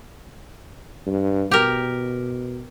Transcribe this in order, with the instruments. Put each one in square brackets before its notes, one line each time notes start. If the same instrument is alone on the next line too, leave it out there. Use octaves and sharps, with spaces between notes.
[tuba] G2
[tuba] B2 [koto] G4 A#4